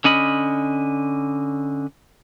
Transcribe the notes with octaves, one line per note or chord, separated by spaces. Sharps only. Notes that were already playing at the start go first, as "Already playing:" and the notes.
D3 C#4 D#5 B5